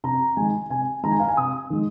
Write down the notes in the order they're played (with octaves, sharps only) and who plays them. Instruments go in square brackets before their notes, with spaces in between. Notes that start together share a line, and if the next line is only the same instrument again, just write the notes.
[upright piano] C3 A#5
D#3 G#3 G#5
C3 G#5
D#3 G#3 A#5
G#5
F5
G#5
C3 D#6
D#3 G#3